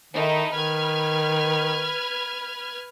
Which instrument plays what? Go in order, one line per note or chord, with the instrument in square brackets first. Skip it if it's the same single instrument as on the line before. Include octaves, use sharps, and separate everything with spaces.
[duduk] D#3 [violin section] D#4 E4 A4
[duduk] D#3 [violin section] B4 F6 G#6